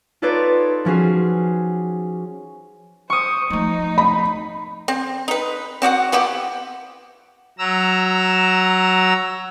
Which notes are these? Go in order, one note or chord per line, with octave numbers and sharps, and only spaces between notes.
D#4 F4 A4 B4 C#5 D5
F3 C#4 F#4 G#4
C5 C#6 D#6
F3 A3 D#4
B5
C4
D#4 B4
C4 F#4 D5 F#5
F3 B3 E4 G4
F#3 A#5 E6